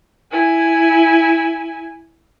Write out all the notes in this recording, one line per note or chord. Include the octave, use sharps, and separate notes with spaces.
E4 G#5